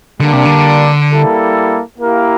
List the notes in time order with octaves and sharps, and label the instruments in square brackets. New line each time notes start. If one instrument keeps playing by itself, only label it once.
[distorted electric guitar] D3 [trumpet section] G3 A#3 D4
[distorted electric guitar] C3
D3
[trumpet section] G3 A#3 E4 A4
A#3 E4 G4 A#4 F5